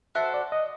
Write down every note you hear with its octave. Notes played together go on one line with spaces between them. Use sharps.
F#4 A4 C5 E5
D5
D#5